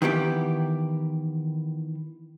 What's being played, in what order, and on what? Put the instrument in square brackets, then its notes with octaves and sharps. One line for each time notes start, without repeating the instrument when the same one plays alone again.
[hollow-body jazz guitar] D#3 E3 B3 G4